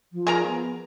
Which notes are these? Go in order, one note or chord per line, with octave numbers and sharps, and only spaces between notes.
F3
G#4 A#4 A#5
B3